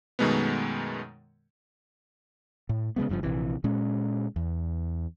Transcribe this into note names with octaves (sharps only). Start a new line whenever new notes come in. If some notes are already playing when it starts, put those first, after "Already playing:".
F#2 B2 D#3 G#3 A3 B3
A2
C#3 G3 G#3 B3
F#1 G2 C#3 F3
A#1 C3 E3
A#2 G#3 C#4
E2